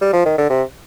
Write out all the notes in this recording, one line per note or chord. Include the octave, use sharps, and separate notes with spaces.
G3
F3
D#3
D3
C3